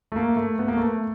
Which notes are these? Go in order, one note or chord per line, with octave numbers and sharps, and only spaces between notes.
A3
A#3
A3
B3
A#3
A3